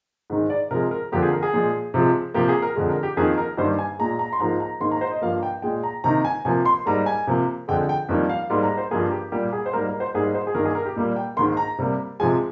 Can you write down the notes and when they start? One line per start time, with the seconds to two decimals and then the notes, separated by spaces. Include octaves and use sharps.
0.30 G#2 D#3 G#3
0.50 D5
0.71 C3 F3 G#3 A#4
0.91 A#4
1.12 F2 D3 F3 A#3 G4
1.22 G#4
1.33 A#4
1.43 G#4
1.54 A#2 F3 G#3
1.94 C3 F3 G#3
2.34 C3 F3 A#3 G4
2.49 G#4
2.62 A#4
2.76 F2 D3 G#3
2.89 A#4
3.03 G4
3.17 F2 D#3 A#3 G#4
3.38 A#4
3.58 G2 D#3 G3 A#3 C5
3.79 G#5
3.99 A#2 G#3 A#5
4.19 A#5
4.33 C6
4.40 G#2 F3 A#3 A#5
4.60 A#5
4.80 G#2 D#3 A#3 C6
4.91 A#5
5.01 C5
5.11 D#5
5.22 G2 F3 A#3 F5
5.43 G5
5.62 A#2 G#3 G5
5.83 A#5
6.04 C3 D#3 A#3 A#5
6.25 G#5
6.45 C3 F3 A#3 G#5
6.65 C6
6.86 G#2 G3 A#3 A#5
7.06 G#5
7.27 C3 F3 A#3
7.68 F2 D3 G#3 G5
7.89 G5
8.09 F2 D#3 G3 A#3
8.29 F5
8.50 G#2 G3 A#3 C6
8.63 A#5
8.77 C5
8.91 G2 F3 A#3 G#4
9.11 G4
9.32 A#2 G3 A#3 G4
9.53 G#4
9.66 C5
9.73 G#2 G3 A#3 A#4
9.86 A#4
10.00 C5
10.14 G#2 G3 A#3 G#4
10.34 C5
10.47 G#4
10.55 G2 D#3 A#3 A#4
10.65 G#4
10.75 A#4
10.86 G4
10.96 A#2 G3 A#3
11.16 G5
11.37 G#2 D#3 A#3 C6
11.57 A#5
11.78 C3 G3 A#3
12.20 C3 F3 G#3 G#5